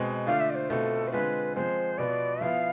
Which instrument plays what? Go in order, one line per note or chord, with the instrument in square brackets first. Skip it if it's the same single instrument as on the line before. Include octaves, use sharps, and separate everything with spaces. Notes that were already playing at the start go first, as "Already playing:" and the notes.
Already playing: [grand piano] B2 G#3 C4
[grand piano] D3 A3 D4 F4 [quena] F5
[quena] E5
D5
C5
[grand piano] B2 A3 C4 F4 [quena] A4
[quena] C5
[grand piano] D3 G#3 C4 F4 [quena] B4
[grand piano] F3 G#3 C4 [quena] C5
[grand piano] B2 B3 F4 [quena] D5
[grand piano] F3 B3 E4 [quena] F5